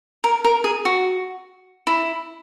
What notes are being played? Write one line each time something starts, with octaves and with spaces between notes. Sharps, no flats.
A#4
A#4
G#4
F#4
E4